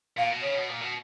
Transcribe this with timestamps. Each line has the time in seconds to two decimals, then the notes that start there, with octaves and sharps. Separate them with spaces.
0.17 A#2 F5
0.30 B2
0.42 C#3 C#5
0.55 B2
0.69 A#2
0.81 B2